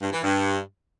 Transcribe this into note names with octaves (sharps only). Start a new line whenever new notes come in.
G2
E3
G2